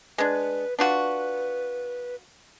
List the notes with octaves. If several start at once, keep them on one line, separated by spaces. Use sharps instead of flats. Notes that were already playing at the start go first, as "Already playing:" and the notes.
G#3 D4 B4
D4 F4 F#4 B4